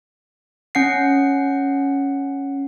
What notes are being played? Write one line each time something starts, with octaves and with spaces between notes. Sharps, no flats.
C#4 F#5 C7